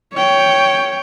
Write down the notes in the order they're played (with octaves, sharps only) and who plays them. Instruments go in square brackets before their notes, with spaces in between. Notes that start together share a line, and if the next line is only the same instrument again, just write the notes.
[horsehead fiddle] C#5 G5